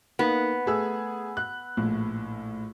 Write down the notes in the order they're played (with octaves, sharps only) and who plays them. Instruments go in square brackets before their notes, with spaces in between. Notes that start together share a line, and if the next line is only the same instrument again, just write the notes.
[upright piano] A#3 D#4 [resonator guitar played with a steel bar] B3
[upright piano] A3 G#4 E6
F#6
A#1 A2